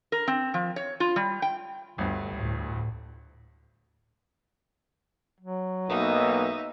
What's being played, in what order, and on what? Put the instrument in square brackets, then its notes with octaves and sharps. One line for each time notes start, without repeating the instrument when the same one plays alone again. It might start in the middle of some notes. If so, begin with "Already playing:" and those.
[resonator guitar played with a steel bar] A#4
C4
F3
C#5
F4
G3
G5
[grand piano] G1 G2 [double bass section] D2
[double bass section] D2 A2
[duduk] F#3
[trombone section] B1 A#3 B3 [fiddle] D#4 [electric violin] D#5 E5